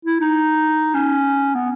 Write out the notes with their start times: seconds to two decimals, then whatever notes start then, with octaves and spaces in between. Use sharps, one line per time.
0.05 E4
0.20 D#4
0.94 C#4
1.55 B3